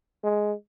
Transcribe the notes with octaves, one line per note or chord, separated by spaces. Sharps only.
G#3